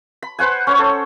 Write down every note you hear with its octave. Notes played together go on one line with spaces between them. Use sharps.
B5
B4 C5 F#5 G#5
C#4 C5 C#5
A4